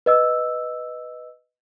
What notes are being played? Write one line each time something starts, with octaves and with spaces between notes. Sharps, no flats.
B4 D#5 E6